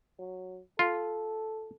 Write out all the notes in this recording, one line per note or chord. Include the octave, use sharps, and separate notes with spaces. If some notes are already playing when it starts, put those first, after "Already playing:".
F#3
F4 A4